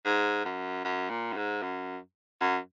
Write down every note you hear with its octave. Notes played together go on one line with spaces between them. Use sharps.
G#2
F#2
F#2
A#2
F#2
G#2
F#2
F#2